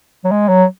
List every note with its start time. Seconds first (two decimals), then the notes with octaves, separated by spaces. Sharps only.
0.24 F#3
0.31 G#3
0.49 F#3